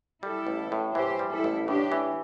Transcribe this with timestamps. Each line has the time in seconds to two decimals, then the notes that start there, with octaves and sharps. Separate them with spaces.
0.23 G3 E4 A4
0.47 A1
0.72 A2
0.95 E3 G4 C5
1.19 G3
1.31 E4 A4
1.44 A1
1.67 A2 D4 G4
1.92 E3